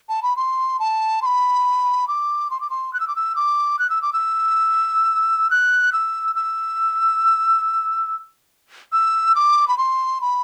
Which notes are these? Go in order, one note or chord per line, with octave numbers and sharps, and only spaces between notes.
A5
B5
C6
A5
C6
B5
D6
C6
D6
C6
F#6
E6
D6
E6
D6
F#6
E6
D6
E6
F#6
E6
E6
E6
D6
B5
C6
B5